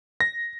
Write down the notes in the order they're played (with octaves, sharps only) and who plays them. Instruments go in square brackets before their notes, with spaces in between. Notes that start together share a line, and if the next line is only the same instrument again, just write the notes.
[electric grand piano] A#6